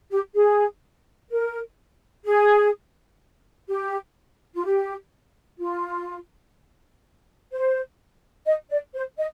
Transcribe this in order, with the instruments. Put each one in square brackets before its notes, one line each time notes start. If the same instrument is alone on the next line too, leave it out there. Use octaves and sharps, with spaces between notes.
[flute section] G4
G#4
A#4
G#4
G4
F4
G4
F4
C5
D#5
D5
C5
D#5